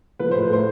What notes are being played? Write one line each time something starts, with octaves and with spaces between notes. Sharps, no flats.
F3 B4
C5
A2
B4
A2 C5